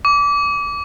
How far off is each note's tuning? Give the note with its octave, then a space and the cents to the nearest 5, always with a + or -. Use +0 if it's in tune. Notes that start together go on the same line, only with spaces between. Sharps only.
D6 -25